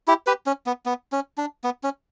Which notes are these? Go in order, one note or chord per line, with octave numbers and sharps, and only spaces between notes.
E4 G4
G4 B4
C#4
B3
B3
C#4
D4
B3
C#4